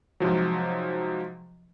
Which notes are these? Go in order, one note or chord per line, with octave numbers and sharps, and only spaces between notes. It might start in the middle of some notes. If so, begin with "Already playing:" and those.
G#2 C3 F3 F#3